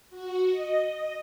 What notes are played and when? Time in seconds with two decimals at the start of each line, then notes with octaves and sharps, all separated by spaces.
0.10 F#4
0.51 D#5
0.80 D#5